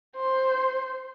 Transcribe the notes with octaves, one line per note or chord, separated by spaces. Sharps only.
C5